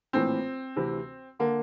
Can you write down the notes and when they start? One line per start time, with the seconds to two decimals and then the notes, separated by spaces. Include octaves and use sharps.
0.13 A#1 A2 E3 C4
0.76 D2 C3 E3
1.39 D3 A#3